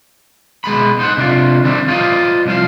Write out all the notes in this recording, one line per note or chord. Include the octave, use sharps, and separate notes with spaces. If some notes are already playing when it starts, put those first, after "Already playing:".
B2 G#3 B3 B5
D#4 C5 F#5
C3 D4 F4
D#3 G3 C4 D4
F4 C5 D5 D#5 F5
C2 F3 F5